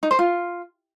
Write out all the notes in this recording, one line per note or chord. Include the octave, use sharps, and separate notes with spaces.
D#4
C5
F4